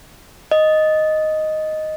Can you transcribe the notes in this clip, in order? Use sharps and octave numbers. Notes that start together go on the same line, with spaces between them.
D#5